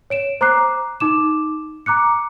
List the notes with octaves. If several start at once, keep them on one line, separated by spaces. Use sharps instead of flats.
C#5 D7 E7
C5 A#5 D6 F#6 C7
D#4 D6 E7
A#5 D6 F#6 C#7